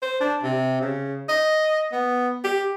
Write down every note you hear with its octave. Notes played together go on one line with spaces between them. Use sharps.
C5
D4
C3
C#3
D#5
B3
G4